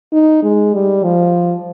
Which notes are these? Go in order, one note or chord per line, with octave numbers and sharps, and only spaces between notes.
D#4
G#3
G3
F3